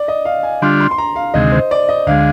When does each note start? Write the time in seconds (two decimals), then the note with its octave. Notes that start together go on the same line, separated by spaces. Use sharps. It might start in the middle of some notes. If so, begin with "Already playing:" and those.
Already playing: D5
0.08 D#5
0.25 F5
0.43 G#5
0.62 D3 G3 D4 F4 C6
0.81 C6
0.91 C6
0.98 A#5
1.16 F5
1.34 D2 C3 D#3 G#3 D#5
1.52 C5
1.71 D5
1.89 D#5
2.07 D2 D3 G#3 F5